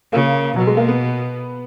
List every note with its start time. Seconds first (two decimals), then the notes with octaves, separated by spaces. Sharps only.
0.13 C#3 A#3
0.56 B2 F#3
0.67 G#3
0.77 A#3
0.88 B3